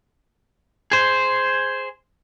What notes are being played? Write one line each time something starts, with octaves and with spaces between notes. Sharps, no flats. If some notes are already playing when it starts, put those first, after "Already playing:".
G#4 C5